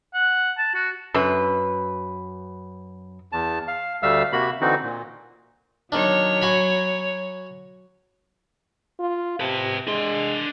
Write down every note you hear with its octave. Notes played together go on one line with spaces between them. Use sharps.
F#5
A5
F#4
F#2 B4
E2 A5
F5
D2 G3 A3 E5 F5 E6
C3 A#3 F#4 B5
D3 E3 C4 D#4 F#4
A#2
D#3 F#3 D4 C#5
F#4 G#5 B5
F4
C3 B4 A5
G#3 D4 C6